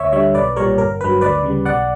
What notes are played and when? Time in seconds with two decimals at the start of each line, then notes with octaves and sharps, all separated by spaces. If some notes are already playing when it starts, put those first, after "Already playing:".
Already playing: D2 C#5 E5
0.12 D3 G3 C#5 E5
0.34 B1 B4 D5
0.56 A#2 G3 A#4 C#5
0.78 G1 A#4
1.01 G2 F#3 B4
1.21 D2 B4 D5
1.43 C#3 G3
1.65 B1 D5 F#5